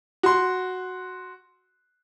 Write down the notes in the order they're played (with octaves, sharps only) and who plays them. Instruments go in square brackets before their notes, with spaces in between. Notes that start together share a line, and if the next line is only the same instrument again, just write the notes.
[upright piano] F#4 C6